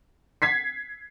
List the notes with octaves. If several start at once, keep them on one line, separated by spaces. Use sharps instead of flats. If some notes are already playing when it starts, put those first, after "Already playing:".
G#6 B6 C7